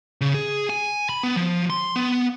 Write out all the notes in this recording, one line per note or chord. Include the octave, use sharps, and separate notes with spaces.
C#3
G#4
G#5
B5
B3
F3
C6
B3